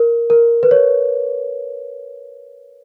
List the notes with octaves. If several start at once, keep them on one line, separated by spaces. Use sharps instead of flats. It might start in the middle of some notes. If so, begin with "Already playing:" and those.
Already playing: A#4
A#4
B4
C#5